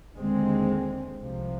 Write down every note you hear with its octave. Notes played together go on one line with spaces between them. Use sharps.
D#2 D3 G#3 C4
C2 C3 F3